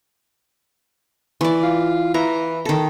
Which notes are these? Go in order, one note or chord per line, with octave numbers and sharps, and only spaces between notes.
E3 D5
F4
E3 A#5
D#3 A4